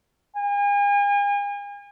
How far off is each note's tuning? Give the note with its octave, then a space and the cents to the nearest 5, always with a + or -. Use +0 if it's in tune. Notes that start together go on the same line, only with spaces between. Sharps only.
G#5 -40